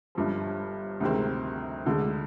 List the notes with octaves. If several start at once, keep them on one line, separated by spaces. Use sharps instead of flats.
G1 G2 F3
D2 C3 D#3 G#3 C4
D2 D3 G#3